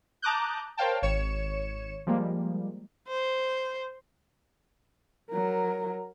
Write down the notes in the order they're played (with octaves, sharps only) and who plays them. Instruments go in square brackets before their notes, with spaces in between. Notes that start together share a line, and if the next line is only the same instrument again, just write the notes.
[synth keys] A5 A#5 D6 D#6 F#6 G6
A#4 C5 C#5 F5 G5 A5
G#1 C#5 C#7 E7
F3 G3 G#3 A#3
[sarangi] C5
[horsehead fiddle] F#3 A#4